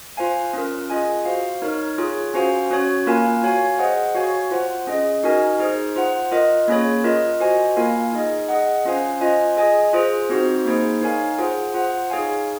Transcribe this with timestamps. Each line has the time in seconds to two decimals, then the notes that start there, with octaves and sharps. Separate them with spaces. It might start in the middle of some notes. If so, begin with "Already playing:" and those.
0.17 F4 C5 F5 G#5
0.53 C#4 F4 A#4
0.90 F4 G#4 D#5 G#5
1.25 F#4 C5 F5
1.62 D#4 A#4 C#5
1.98 F4 G#4 C#5
2.34 C#4 F#4 C5 F5 G#5
2.71 C#4 F#4 C#5
3.06 A#3 F4 A#4 F5 G#5
3.43 F#4 C#5 F5 G#5
3.79 G#4 C5 D#5 F#5
4.15 F#4 C#5 F5 G#5
4.51 F4 C5 F#5
4.87 C#4 G#4 D#5
5.23 D#4 F#4 A#4 D#5 G#5
5.60 D#4 G#4 C5
5.96 F4 C5 F#5
6.31 F4 A#4 D#5
6.68 A#3 C#4 G#4 C#5
7.04 F4 A#4 D#5
7.40 F#4 C5 D#5 G#5
7.77 A#3 F4 A#4 F5 G#5
8.13 D#4 G#4 D#5
8.49 G#4 D#5 F#5
8.85 C#4 F4 C5 F5 G#5
9.21 F4 C5 D#5 G#5
9.57 G#4 D#5 G#5
9.93 F4 G#4 C5
10.29 C4 D#4 F#4 C5
10.66 A#3 D#4 G#4 C5
11.02 D#4 A#4 C#5 F5 G#5
11.38 F4 G#4 C5 F#5
11.74 F4 C5 F#5
12.10 D#4 G#4 C#5 F5 G#5